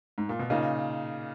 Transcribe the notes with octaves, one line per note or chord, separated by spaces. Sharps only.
G#2
A#2
B2
A#2 C#3 D#4